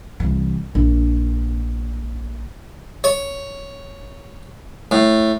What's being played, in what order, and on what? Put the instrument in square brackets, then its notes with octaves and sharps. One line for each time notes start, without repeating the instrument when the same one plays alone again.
[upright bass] C2 E3
A#1
[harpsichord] C#5
A2